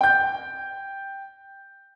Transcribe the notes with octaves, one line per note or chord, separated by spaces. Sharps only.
G5 G6